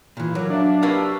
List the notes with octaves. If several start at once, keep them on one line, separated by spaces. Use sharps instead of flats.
A#2 E3 F4
F#3 A#4 D6
D4 E5 F5 D6
G4 A#4 B4 F5 C#6 E6